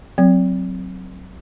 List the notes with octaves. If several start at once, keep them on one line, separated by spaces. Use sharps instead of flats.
F#3 C4